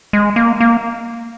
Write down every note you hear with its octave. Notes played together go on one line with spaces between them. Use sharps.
G#3
A#3
A#3